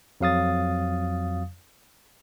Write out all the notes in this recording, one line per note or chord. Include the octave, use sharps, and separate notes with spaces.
F2 F#3 F5 D#6 A6